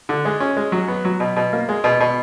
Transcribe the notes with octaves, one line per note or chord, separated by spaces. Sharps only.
D3
G#3
C#4
G#3
F#3
B3
F#3
B2
B2
A#3
G#3
B2
B2